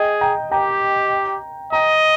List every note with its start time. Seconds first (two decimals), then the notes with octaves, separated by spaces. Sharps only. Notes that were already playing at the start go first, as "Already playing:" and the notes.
Already playing: G#4 D#5 G5
0.21 G5 A#5
0.51 G4 G5 A#5
1.72 D#5 G5 A#5